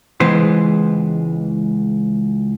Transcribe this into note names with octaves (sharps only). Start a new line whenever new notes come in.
C#2 E3 G#3 B3 B4 C5